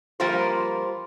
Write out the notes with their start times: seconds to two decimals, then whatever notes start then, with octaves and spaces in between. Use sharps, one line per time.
0.20 F3 G3 A#3 F4 A#4 C5